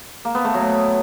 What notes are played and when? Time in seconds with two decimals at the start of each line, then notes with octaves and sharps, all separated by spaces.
0.25 A#3
0.35 B3
0.44 A3
0.54 F#3